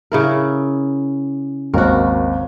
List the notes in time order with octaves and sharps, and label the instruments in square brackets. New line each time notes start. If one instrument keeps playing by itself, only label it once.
[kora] C#3 E4 A#4
[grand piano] G#1 D#2 [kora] F#4 A#4